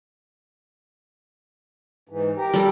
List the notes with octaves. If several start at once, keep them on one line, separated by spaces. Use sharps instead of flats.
G#2 E3
G4 A#4
G3 A4